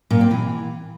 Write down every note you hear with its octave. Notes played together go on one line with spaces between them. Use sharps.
A#2
C4
E3